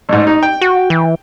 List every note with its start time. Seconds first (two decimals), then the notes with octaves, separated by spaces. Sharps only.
0.09 A1 G#2
0.27 D#4
0.43 G5
0.61 F#4
0.90 E3